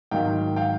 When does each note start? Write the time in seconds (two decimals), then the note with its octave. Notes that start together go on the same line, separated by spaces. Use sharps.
0.11 G#2 D#3 F#3 F5 G5
0.56 F5 G5